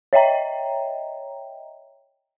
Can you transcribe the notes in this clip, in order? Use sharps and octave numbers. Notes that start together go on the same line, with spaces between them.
C#5 D#5 E5 G5 A#5